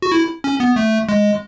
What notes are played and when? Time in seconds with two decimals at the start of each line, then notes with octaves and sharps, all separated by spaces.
0.02 F#4
0.12 E4
0.44 C#4
0.60 B3
0.76 A3
1.09 G#3